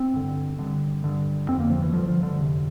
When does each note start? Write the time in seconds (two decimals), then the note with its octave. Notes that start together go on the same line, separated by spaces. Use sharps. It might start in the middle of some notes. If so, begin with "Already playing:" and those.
Already playing: C4
0.14 G2 D3
0.59 G2 D3
1.04 G2 D3
1.48 F2 D3 C4
1.60 A#3
1.70 F3
1.82 E3
1.93 G2 D3 F3
2.08 F3
2.23 D3
2.38 F2 C3